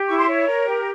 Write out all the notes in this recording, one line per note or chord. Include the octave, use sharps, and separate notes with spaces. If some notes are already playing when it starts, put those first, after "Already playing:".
Already playing: G4
E4 C#6
C6
C#5
A#4
G4